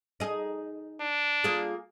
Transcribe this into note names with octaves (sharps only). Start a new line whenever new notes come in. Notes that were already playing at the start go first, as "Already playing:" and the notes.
D#4 G#4
D4
A#3 F4 G#4